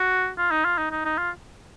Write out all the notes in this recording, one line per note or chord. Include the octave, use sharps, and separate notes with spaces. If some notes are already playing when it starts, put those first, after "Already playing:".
Already playing: F#4
F4
D#4
F4
D#4
D#4
D#4
F4